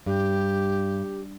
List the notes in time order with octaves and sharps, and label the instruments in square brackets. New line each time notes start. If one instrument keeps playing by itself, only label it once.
[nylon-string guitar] G2 [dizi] G4